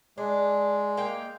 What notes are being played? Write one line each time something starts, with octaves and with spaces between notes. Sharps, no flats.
G#3 D4
A#3 F5 G5